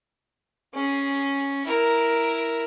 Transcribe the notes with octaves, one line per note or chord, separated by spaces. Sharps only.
C#4 G#4
E4 A#4